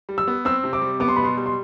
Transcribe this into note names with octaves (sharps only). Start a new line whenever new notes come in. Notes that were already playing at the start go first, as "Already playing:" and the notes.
G3
E6
B3
C4 E6
C3
D6
G3
B3 D6
C6
B2 B5
C6
G3
C6